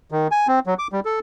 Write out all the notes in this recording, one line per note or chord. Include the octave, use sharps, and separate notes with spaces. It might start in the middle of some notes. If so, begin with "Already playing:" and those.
D#3
G#5
C4
F#3
D6
G3
A4